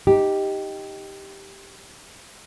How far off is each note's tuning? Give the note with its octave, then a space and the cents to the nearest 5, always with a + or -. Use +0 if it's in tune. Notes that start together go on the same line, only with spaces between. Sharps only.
D#4 +0 G4 +0